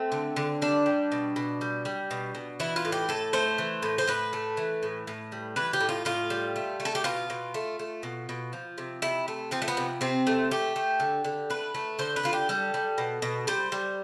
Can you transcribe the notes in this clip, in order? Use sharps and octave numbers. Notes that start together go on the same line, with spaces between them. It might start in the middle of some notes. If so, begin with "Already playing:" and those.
Already playing: A3 C4
D3
D3
G3 D4
G3
B2
B2
G3
G3
B2
B2
E3 E4
F4
A2
G4
A2 A4
A3 C5
E3
A2
C5
A2 B4
A3
E3
A2
A2
G3
E3 B4
G4
A2
F4
A2 F4
G3
A3
A3
A4
G4
B2 F4
B2
A3
A3
B2
B2
F3
C3
C3 E4
A3
F3 C4
A3
B3
C3
C3 C4
A3
A3 G4
A3
D3
D3
A3 B4
A3
D3 C5
B4
D3 F4
G4
G3 A4
G3
B2
B2
G3 C5
G3